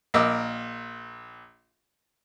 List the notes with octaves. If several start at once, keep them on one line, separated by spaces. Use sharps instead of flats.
A#1 A#4 D#5 D6 E6